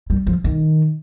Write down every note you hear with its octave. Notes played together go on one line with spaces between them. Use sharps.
G3
F3
D#3